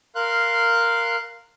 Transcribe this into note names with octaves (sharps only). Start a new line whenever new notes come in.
A#4 F5 C6 F#6